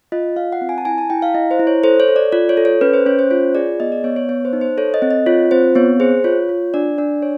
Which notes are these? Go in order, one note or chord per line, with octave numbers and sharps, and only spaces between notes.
F4 D#5
F4 F5
F#5
C4
G#5
A5
E4 G#5
A5
E4 G5
F5
E4 D#5
C5
E4
C#5
A4 C5
C#5
A4
D5
F4 D5
C#5
A4
C#5
C#4 B4
C5
C#4 C#5
C5
F4 C#5
G#4 D5
B3 D#5
D5
B3 C#5
C#5
B3 C#5
C5
D#4
C5
A4 C#5
D#5
C4
D#5
F4 C#5
C4 C5
B3 C#5
G#4 C5
F4 C#5
F4
D4 D5
D4 D5
C#5